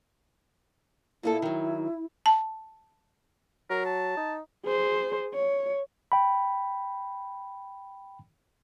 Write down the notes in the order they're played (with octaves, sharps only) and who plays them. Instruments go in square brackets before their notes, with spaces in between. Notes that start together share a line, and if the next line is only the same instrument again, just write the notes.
[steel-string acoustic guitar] A#2 A#3 A4 [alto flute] E4
[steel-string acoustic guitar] D#3 F#3
[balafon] A5
[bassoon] F#3 [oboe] A#4
[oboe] A5
[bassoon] D#4
[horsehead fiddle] G#4 C5
C#5
[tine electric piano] G5 B5